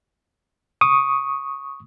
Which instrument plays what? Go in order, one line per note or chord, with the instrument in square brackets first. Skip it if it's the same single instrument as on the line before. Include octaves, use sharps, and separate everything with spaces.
[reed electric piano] C#6 D#6